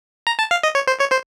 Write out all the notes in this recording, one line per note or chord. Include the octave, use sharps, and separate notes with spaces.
A#5
A5
F5
D#5
C#5
C5
C#5
C5